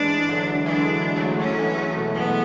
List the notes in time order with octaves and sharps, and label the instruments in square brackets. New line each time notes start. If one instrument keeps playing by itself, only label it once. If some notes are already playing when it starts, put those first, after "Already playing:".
Already playing: [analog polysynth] E3 G#3 [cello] D4
[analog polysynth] D3 F#3
[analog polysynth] E3 G#3 [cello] D4
[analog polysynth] F#3 A3
[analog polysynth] F#3 A3 [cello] C#4
[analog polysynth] E3 G#3
F#3 A3
B2
[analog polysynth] B2 [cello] B3